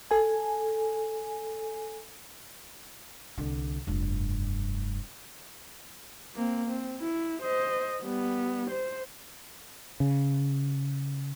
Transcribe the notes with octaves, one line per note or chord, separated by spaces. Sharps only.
A4 G#5
C2 D3
F1 G2
A#3 C4
C4
E4
C5 D#5
G3 B3
C5
C#3